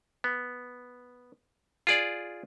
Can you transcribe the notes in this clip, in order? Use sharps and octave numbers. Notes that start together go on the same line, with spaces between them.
B3
F4 G#4 D5